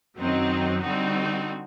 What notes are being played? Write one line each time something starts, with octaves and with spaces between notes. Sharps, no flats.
F#2 D#3 F#3 C4 D#4
D3 G3 C4 D#4 F#4